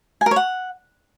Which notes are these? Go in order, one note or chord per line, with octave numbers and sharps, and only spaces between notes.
G#5
A#4
C#5
F#5